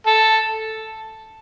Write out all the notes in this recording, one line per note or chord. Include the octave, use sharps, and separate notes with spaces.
A4